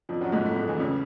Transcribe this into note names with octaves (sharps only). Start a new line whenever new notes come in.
F2 F3
F#2 F#3
G#2 G#3
A2 A3
G#2 G#3
E2 E3
C#2 C#3